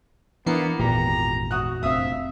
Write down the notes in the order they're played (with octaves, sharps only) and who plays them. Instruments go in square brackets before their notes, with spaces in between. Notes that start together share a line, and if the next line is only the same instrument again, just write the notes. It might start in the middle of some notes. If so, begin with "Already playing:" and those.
[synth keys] E3 C7 C#7 [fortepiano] A#3 [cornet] B3 [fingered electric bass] D4
[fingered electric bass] G#1 [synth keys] E2 A#2 [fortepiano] G4 [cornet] A#5
[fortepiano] F#4 D#6 F#6
[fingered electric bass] F1 A#1 C4 [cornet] E5 [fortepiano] F5 D#6